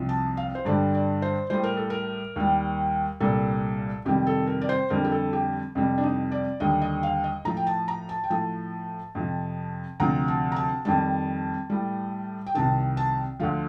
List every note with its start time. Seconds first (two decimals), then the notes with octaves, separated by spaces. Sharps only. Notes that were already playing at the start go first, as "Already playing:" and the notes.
Already playing: C2 C3 F3
0.09 A5
0.37 F5
0.55 C5
0.65 G2 D3 G3 D5
0.94 D5
1.22 C5
1.50 A2 G3 C5
1.63 A#4
1.77 A4
1.90 A#4
2.36 D#2 D#3 G3
3.20 C2 A#2 G3 A4
4.05 F2 C3 D#3 G3 G4
4.27 A4
4.47 A#4
4.61 D5
4.69 C5
4.90 F2 D3 G3 A#4
5.05 G4
5.12 A4
5.33 G4
5.75 F2 C3 G3
5.98 D4
6.03 D#4
6.32 D5
6.60 D#2 D3 G3 D#5
6.82 D#5
7.03 F5
7.24 D#5
7.45 A2 F3 A#5
7.57 G5
7.67 A5
7.88 A#5
8.09 A5
8.24 G5
8.30 A2 F3 A5
9.15 F2 C3 F3
10.00 D2 C3 F3 A#5
10.28 A5
10.52 A#5
10.56 A5
10.85 F2 D#3 G3 A5
11.70 A2 G3
12.47 G5
12.55 C2 C3 D#3 A5
12.97 A5
13.40 D2 D3 F3 F5